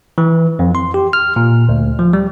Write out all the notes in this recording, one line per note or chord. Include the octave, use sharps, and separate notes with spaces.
E3
F2
C6
G4
F6
A#2
D2
F3
G3